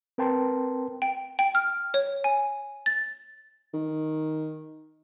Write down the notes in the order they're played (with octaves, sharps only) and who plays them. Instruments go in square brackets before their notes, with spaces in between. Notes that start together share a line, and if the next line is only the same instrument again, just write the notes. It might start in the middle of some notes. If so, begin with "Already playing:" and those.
[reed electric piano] C4 A#4 B4 G5 A5 C6
[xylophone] G5
G5
F6
C#5
G#5
A6
[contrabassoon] D#3